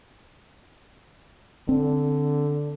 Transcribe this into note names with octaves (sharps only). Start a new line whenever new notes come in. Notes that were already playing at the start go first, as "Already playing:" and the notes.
D3 C4